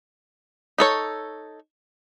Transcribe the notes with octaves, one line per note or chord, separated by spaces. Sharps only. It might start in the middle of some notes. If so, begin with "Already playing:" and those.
D#4 A4 C#5